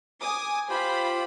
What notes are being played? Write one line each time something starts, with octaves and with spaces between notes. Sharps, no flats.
G#5 D6 D#6
F4 G4 C5 B5